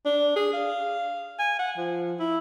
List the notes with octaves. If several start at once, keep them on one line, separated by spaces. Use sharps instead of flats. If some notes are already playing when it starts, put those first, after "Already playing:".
D4
G#4
F5
G#5
F#5
F3
E4